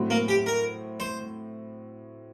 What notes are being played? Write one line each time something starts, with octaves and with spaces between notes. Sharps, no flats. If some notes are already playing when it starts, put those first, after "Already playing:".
Already playing: A2 F#3 C4 F#4 C5
A#3
G4
A#4
C5